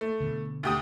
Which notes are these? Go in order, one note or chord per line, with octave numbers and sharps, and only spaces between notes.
A3
B2 D3
D2 G4 D#6